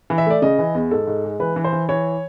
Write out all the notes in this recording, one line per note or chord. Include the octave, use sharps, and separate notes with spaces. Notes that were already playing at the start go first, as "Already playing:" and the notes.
E3
E5
A3 D5
C#3 D#5
E3
E2
G#2 A4
G#2
G#3
E3 B4
E3
C5
E3
E3 C#5